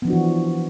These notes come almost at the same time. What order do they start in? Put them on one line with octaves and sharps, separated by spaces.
B3 F3 D4 F#4 E3